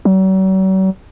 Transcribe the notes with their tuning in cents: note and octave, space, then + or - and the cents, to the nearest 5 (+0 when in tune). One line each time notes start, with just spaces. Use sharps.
F#3 +45